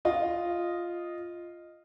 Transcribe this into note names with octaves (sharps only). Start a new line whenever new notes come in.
F4 D#5